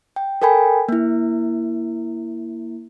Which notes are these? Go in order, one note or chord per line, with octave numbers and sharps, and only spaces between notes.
G5
A4 A#4 G5 G#5 B5
A#3 E4